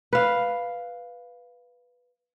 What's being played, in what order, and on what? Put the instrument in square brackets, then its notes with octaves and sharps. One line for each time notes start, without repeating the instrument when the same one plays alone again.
[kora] B4 F5